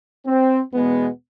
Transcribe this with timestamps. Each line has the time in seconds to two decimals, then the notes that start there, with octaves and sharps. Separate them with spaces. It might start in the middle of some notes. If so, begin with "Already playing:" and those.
0.27 C4
0.74 E2 B2 G#3 B3